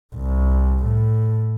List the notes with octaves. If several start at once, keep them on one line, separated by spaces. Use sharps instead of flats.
C2
A2